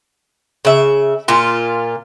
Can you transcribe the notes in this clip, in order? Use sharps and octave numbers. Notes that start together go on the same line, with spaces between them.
C#3 E5
A#2 F4